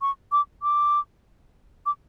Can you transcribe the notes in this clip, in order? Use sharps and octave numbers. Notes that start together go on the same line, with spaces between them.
C#6
D6
D6
D6